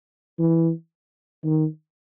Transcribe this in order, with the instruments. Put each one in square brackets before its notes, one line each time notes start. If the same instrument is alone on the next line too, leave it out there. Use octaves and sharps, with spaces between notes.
[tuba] E3
D#3